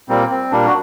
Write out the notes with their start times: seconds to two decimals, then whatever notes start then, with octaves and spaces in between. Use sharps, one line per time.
0.09 A#2 G3 A#3 C4
0.30 C4
0.51 A#2 G3 A#3 D4
0.66 F#4